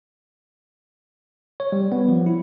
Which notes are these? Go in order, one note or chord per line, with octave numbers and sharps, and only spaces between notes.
C#5
G3
B3
F3
E4